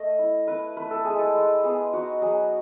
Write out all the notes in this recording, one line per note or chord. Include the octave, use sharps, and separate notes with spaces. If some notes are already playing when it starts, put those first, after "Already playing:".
Already playing: A3 D#5
E4
E4 B4
A3 B4
A4
G#3 G#4
A4
G#3
B3 G#4
D#4 F#4
F#3 G#4